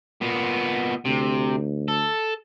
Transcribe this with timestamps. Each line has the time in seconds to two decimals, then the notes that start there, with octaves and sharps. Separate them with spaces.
0.21 A#2 B3
1.05 D2 C3
1.88 A4